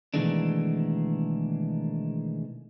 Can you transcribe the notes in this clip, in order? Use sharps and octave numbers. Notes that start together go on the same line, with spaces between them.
B2 D#3 E3 G#3 A3 D4